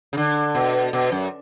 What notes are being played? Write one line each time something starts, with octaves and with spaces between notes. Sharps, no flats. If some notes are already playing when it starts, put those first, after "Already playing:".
C#3
D3
B2
B2
F#2